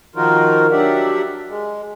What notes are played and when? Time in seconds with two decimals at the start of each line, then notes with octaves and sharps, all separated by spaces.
0.16 D#3 F3 D#4 F4 F#4 A#4
0.72 F#3 D4 G4 D5 E5 F#5
1.48 G#3